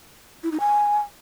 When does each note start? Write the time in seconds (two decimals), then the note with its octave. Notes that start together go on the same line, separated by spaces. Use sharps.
0.43 E4
0.52 D#4
0.60 G#5